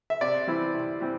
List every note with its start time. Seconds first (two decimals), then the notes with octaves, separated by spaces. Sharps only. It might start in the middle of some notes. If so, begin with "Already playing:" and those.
0.10 E5
0.21 C3 D5
0.47 E3 G3 C4 E4
0.74 C3
1.01 E3 G3 C4